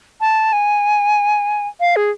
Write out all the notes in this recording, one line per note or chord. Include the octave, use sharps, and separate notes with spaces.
A5
G#5
F5
G#4